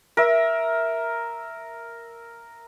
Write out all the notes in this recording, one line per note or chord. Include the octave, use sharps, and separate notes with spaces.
A#4 E5